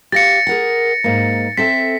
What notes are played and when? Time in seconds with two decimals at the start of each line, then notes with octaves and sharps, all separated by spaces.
0.12 G4 F5 A6 A#6 C#7
0.47 G#4 A#4 F#5
1.04 G#2 A#3
1.57 C4 A4 E5 B6